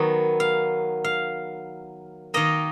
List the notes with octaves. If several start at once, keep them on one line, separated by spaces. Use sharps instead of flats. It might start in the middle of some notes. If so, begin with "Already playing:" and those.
Already playing: D#3 F#3 B3 B4
F5
F5
D#3 A#3 D#5